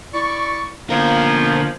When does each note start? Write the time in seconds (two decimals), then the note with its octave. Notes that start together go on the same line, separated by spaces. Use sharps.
0.14 E4 D5 C#6
0.90 D3 F3 A#3 B3 C#4 A#4